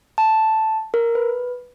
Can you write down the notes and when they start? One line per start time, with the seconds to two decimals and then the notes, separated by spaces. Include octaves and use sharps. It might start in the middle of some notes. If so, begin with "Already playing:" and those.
0.18 A5
0.94 A#4
1.15 B4